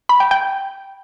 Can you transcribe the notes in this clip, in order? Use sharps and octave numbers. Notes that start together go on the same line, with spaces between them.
B5
G5
G5